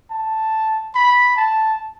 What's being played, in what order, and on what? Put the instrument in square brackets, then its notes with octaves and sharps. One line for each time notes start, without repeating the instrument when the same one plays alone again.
[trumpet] A5
B5
A5